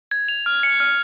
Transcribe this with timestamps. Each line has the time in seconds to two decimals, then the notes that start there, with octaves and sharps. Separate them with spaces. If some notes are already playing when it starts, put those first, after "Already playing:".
0.11 G#6
0.28 F7
0.46 F6
0.63 C#7
0.80 F6